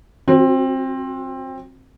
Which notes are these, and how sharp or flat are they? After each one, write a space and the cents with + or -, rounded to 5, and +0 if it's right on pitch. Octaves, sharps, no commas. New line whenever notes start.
F#3 +15 C4 +20 F#4 -35